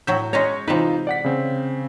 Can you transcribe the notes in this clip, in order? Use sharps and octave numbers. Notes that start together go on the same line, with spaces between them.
A2 F#3 E5 G6
G#3 C#4 C#5 A#5
C3 E3 D#4 F4 B4
D5 F#5 B6
C#3 C4